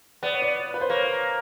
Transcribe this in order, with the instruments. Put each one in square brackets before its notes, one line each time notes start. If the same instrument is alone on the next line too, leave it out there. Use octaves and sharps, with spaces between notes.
[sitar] B3 [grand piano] D5
[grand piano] C#5
D5
B4
C5
[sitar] A#3 [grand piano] C#5